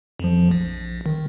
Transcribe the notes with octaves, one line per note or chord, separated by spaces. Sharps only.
F2 F3
A#1
D#3